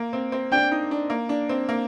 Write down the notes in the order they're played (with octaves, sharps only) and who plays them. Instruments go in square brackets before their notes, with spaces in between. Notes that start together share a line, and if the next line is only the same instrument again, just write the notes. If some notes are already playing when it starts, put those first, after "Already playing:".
Already playing: [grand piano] A#3
C4
C4
[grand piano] D4 [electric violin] G5
[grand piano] D#4
D4
A#3
D4
C4
A#3